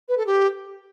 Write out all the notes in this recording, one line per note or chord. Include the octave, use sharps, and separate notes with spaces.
B4
A4
G4